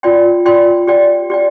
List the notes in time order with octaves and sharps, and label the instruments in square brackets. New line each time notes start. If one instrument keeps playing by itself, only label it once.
[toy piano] F4 D5 G5 C6
F4 D5 G5 C6
G4 D5 G5
G4 D5 G5